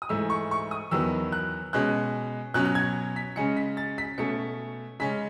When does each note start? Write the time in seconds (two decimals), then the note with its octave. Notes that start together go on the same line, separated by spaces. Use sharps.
0.02 D#6
0.09 G#2 E3 A3 E6
0.30 C#6
0.51 C#6
0.71 D#6
0.91 E2 D#3 F#3 B3 E6
1.32 F#6
1.73 B2 G#3 C#4 F#6
2.54 B2 F#3 C#4 F#6
2.65 F#6
2.75 G#6
3.16 B6
3.36 C#3 G#3 C#4 C#7
3.56 B6
3.77 A6
3.98 B6
4.18 B2 A3 C#4 C#7
4.99 C#3 G#3 C#4 B6